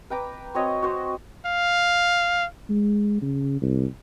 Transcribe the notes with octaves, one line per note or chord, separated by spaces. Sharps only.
B4 G5 A#5 D6
C4 F#4 C#5 D#5
F#4 C5
F5
G#3
C#3
C2